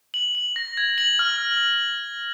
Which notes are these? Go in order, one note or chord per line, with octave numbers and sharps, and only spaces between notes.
F#7
F#7
A#6
G#6
F#7
F6